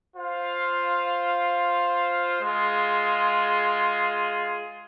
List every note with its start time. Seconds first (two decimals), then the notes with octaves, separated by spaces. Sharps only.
0.16 F4 C5 F5
2.41 G#3 F4 G#4